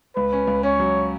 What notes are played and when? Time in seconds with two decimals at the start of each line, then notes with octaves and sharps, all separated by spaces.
0.16 C#2 B4
0.33 C#4
0.47 C#2
0.63 C#4 C#5
0.80 F#3